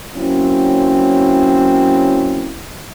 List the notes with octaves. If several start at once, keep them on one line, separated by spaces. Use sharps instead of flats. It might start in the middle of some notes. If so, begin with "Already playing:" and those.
F#3 A#3 C4 C#4 E4